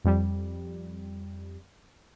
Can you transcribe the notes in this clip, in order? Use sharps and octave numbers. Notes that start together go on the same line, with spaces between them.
F2 G3